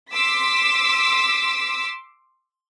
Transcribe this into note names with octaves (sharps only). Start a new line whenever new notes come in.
C6 D6 E6 B6